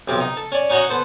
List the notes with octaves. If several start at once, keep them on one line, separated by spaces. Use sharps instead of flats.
B1 C3 F3 D6
D#4
A4
C#4 D5
C#4 D#4 F#4 C#5 D#5 F#5
B3 A4 C5